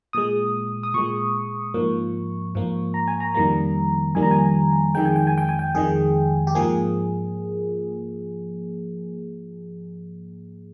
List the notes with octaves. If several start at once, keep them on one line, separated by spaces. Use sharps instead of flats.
A#2 G#3 D#6
D#6
A#2 G#3 C#6
G#2 F3 A#3
G#2 F3 A#3
A#5
G#5
A#5
F2 D#3 G3 A#3 A#5
F2 D#3 G3 A#3 G#5
A#5
G#5
F2 D#3 G#3 G5
G#5
G5
G#5
G5
G#5
G5
F2 D#3 G#3 G#4
G4
G#2 F3 A#3 G#4